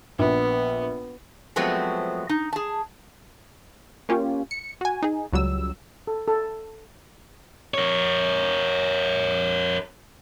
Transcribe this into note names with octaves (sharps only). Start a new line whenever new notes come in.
A#1 B3
F3 F#3 G#3 A3 B3 C4
D#4
G#4 A5
A#3 C#4 F4 G4
C#7
F#4 G#5
D#4 G#4
C#2 F#3 G3 E6
A4
A4
A#4 C#5